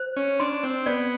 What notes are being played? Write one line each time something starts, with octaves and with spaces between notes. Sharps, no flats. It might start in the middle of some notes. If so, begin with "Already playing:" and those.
Already playing: C5
C#4
D4 C6
C4
B3 D5